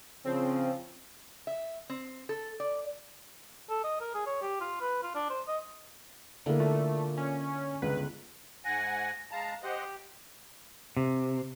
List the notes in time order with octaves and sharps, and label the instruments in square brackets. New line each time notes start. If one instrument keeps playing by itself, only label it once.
[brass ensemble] C#3 F3 [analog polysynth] C4
[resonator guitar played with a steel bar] E5
C4
A4
D5
[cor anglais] A4
D#5
A#4
G#4
C#5
G4
F4
B4
F4
D4
C5
D#5
[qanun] D3 [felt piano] A#3 E4
[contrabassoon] A#2 [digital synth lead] A3
[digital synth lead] C#4
[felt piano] G1 C#2 [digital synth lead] B4
[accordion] G#2 F#5 G#5 [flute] A#6
[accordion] G#3 A5 A#5 [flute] F5
[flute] G4 [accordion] C5 D#5 F#5
[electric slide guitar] C3